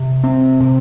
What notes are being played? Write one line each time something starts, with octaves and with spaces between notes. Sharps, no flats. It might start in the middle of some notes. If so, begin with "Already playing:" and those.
Already playing: C3
C4
C3